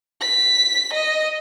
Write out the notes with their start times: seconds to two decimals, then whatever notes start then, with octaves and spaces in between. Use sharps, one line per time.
0.21 B6
0.94 D#5